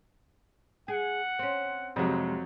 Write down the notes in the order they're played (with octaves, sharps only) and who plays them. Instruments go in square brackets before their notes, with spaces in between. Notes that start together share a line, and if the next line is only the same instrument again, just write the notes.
[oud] G#4 [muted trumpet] F#5
[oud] C4 C#4
[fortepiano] F2 F#3 [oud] C3 G#3